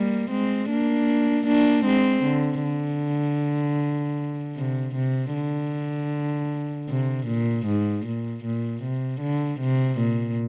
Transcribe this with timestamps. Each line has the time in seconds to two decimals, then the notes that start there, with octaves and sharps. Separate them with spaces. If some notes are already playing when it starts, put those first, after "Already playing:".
Already playing: G3 A#3
0.31 G#3 C4
0.70 A#3 D4
1.47 A#3 D4
1.85 G#3 C4
2.24 D3
2.63 D3
4.56 C3
4.95 C3
5.34 D3
6.89 C3
7.27 A#2
7.66 G#2
8.06 A#2
8.45 A#2
8.84 C3
9.21 D3
9.60 C3
9.99 A#2